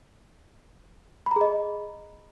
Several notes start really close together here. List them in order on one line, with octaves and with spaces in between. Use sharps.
B5 A#5 G#4 D#5